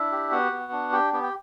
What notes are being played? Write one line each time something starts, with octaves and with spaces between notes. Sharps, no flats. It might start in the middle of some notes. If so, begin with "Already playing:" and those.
Already playing: D4 E4 E5
G4
B3 F#4 F#5
B3
D4
G4 G5
B3 G4 G5
G5